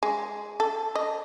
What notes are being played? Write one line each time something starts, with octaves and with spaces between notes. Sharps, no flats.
G#3
A4
D#5